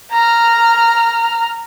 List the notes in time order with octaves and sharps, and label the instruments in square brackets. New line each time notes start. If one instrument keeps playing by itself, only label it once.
[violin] A#5 F6